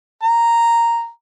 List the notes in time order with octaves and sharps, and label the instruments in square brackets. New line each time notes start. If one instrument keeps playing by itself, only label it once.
[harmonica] A#5